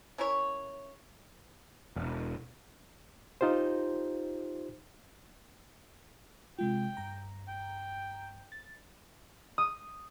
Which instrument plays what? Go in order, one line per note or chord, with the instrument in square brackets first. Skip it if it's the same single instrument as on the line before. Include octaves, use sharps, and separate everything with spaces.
[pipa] C#4 E4 A#4 C#5
[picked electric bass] E1
[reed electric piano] D#4 F4 G4 C5
[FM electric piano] C3 G#3 F4 [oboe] G5
[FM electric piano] G2 A#5
[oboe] G5
[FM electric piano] A6
[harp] D#6